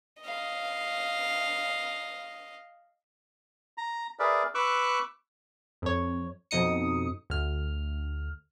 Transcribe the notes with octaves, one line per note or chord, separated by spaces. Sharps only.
D#5 F5
A#5
G#4 A#4 B4 D5 E5
B4 C#6 D6 E6 F#6
F2 C#5
F2 B2 D#4 D#6 C#7
D2 F6